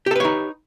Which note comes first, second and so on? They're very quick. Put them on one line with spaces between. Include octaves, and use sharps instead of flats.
G4 A4 B4 C#5 D#4